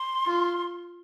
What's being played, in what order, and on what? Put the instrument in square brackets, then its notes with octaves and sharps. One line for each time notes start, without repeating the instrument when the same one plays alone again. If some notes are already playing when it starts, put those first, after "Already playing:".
Already playing: [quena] C6
[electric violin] F4